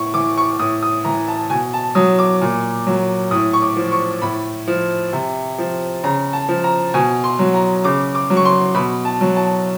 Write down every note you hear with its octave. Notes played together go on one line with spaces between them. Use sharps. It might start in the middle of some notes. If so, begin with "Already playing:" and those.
Already playing: A2 C#6
E3 D6
C#6
A2 D#6
D#6
E3 A#5
A5
B2 G#5
A5
F#3 D#6
D6
A#2
F#3
A2 D#6
C#6
D6
F3
C#6
A2 B5
F3
C3
F3
C#3 A#5
A5
F3
A#5
B2 G#5
C6
F#3
A#5
C#3 D6
D6
F#3
C#6
C6
B2 B5
A5
F#3
A5